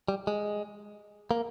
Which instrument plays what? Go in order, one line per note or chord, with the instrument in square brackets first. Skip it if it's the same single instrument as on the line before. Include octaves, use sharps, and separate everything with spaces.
[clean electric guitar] G3
G#3
A#3